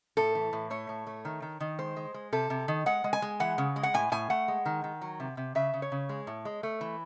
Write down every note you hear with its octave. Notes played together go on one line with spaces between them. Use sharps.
A2 A4
E3
A2
A3 C#5
A2
A3
D#3
D#3
D#3
G#3 C5
G#3
G#3
C3 A4
C3
D#3
G#3 F#5
G#3
G#5
G#3
E3 F#5
C#3
G#3
F#5
A2 G#5
A2 G#5
A3 F#5
G#3
D#3
D#3
F#3
C3
C3
C#3 E5
C#3
C#5
C#3
G#3
A2
G#3
A3
E3